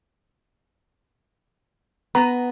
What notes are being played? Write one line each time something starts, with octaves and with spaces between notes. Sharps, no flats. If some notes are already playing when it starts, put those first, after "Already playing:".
B3 A#5